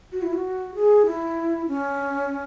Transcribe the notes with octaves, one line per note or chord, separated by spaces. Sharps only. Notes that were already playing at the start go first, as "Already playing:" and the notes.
F#4
E4
F#4
G#4
E4
C#4